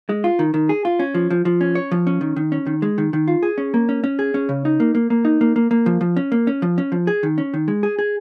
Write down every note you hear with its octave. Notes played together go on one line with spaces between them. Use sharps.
G#3
F4
D#3
D#3
G#4
F4
C#4
F3
F3
F3
C#4
C#5
F3
C#4
D#3
D#3
C#4
D#3
G#3
D#3
D#3
F4
G#4
C#4
A#3
C#4
C#4
G#4
C#4
C#3
D#4
A#3
A#3
A#3
D#4
A#3
A#3
A#3
F3
F3
C#4
A#3
C#4
F3
C#4
F3
G#4
D#3
C#4
D#3
G#3
G#4
G#4